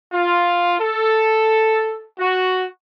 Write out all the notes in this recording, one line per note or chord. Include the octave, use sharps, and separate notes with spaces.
F4
A4
F#4